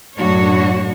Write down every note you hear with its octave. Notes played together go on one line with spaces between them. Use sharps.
F#2 A2 D4 F#4 C#5